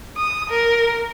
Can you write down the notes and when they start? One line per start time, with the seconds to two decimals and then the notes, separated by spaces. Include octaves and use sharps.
0.17 D#6
0.50 A#4